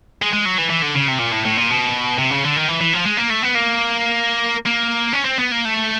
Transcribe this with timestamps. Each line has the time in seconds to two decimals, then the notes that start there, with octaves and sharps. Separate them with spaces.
0.22 G#3
0.33 G#3
0.45 F#3
0.58 E3
0.70 E3
0.82 D3
0.96 C#3
1.08 C3
1.20 A#2
1.32 A2
1.45 A2
1.57 A#2
1.70 B2
2.19 C3
2.31 C#3
2.44 D3
2.56 D#3
2.68 E3
2.81 E3
2.93 F3
3.06 G#3
3.18 A#3
3.30 A3
3.43 B3
3.55 A#3
4.66 A#3
5.13 C#4
5.25 C4
5.39 B3
5.51 A#3
5.65 A3